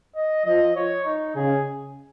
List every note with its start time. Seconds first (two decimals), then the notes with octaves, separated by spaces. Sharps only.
0.16 D#5
0.46 F3 D#5
0.76 C#5
1.05 D#4
1.36 C#3 G#4